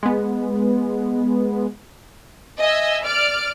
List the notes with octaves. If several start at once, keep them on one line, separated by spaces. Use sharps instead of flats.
G#3 B3
D#5 E5 G#5 E6
D5 F6 D7